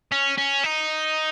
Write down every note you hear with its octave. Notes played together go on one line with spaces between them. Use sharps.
C#4
C#4
D#4